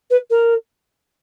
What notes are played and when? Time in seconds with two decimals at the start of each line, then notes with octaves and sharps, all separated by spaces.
0.10 B4
0.30 A#4